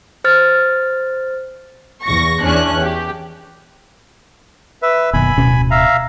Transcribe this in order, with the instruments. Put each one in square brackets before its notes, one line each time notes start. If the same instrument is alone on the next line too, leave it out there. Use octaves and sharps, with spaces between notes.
[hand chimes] C5 F6 A6
[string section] E2 C#6 A#6
E2 C#4 D4 F#6
G4
[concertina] B4 E5
[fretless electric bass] F#1 B2 D#3 [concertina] G#5 B5
[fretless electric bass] D1 B2 C#4
[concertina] E5 F5 A#5